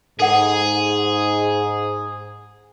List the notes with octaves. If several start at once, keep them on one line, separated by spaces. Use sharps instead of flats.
G#2 G#4 A4 F#5